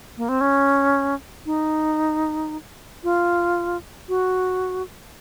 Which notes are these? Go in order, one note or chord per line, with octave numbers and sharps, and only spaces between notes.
A#3
C4
C#4
D#4
F4
F#4